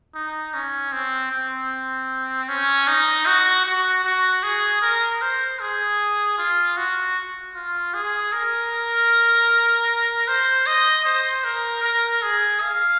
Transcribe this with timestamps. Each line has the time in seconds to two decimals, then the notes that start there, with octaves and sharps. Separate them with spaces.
0.15 D#4
0.54 C#4
0.92 C4
1.31 C4
2.48 C#4
2.87 D#4
3.26 F#4
3.65 F#4
4.04 F#4
4.43 G#4
4.82 A#4
5.21 C5
5.60 G#4
6.38 F4
6.77 F#4
7.54 F4
7.94 G#4
8.32 A#4
10.28 C5
10.66 D#5
11.05 C5
11.44 A#4
11.83 A#4
12.22 G#4
12.61 F5